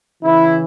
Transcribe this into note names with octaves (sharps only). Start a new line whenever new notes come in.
C#3 E3 E4